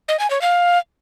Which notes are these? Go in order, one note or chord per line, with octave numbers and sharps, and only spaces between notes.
D#5
G#5
C#5
F5